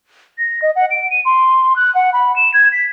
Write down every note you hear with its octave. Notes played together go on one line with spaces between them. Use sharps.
A#6
D#5
F#5
D7
D#7
C6
F#6
F#5
B5
E7
G#6
B6